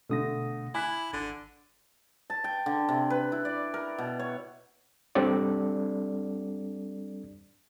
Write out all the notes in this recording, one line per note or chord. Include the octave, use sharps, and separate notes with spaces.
B2 D3 A3 D#6 A#6
E4 G#5 B5 D6 F#6 B6
G#1 D3
A5
G5
D3
C3
B4
E4
D5
A#4
B2
C#5
G3 C4 D4 A4 D5